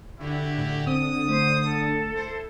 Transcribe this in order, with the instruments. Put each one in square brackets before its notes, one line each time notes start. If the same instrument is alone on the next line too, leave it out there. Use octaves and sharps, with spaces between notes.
[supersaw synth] D3 [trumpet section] E4 F#4 G4
[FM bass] A2
[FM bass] C4 [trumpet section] D#6
[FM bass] A3 [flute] C5
[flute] A4
[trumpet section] E4 C5